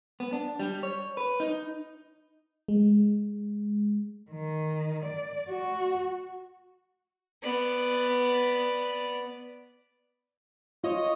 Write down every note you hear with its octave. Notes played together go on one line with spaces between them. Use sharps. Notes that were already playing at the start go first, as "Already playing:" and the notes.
B3
D4
G3
C#5
B4
D#4
G#3
D#3
D5
F#4
B3 D5
F4 C#5 D#5